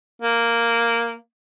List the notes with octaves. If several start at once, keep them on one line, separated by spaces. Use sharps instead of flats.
A#3